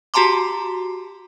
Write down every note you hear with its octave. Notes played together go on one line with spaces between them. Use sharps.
F#4 G4 A5 A#5 C6 D6